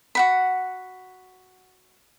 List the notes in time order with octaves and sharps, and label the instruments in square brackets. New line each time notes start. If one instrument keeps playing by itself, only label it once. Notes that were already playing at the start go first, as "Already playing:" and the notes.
[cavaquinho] F#4 F#5 B5